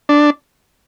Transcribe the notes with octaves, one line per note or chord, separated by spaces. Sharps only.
D4